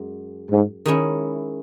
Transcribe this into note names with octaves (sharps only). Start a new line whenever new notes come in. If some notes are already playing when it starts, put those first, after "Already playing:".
Already playing: F#2 G#3
G#2
D#3 G#3 C#4 E4